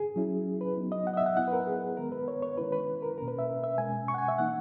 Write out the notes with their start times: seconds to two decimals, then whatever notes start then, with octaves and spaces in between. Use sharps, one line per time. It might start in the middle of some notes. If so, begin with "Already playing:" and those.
Already playing: G#4
0.16 F#3 C#4 E4
0.61 B4
0.77 F#3 B3 D#4
0.92 D#5
1.07 F#5
1.13 D#5
1.17 E5
1.26 F#5
1.37 F#3 B3 E4 F#5
1.48 B4
1.53 A#4
1.67 G#4
1.97 D#3 G#3 B3 A#4
2.12 B4
2.28 C#5
2.42 C#5
2.57 D#3 G#3 C#4 E4 B4
2.72 B4
3.02 A#4
3.18 B2 A#3 C#4 A#4
3.28 B4
3.38 E5
3.64 E5
3.78 B2 G#3 C#4 G#5
4.08 C#6
4.14 F#5
4.18 G#5
4.28 E5
4.38 E3 A#3 D#4 F#5